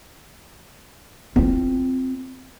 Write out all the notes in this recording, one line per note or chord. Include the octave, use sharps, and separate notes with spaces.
C4 F4